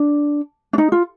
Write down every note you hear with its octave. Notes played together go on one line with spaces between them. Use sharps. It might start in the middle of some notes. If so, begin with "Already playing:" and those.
Already playing: D4
D4
D#4
F4